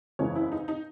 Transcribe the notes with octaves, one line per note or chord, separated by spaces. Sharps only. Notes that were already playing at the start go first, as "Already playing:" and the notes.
F#1 E2 C#3 E3 G#3 C#5
E4
D#4
D#4